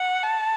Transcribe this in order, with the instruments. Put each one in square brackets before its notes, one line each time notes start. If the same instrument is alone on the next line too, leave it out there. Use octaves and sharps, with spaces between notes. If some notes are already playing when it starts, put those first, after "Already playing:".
Already playing: [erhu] F#5
A5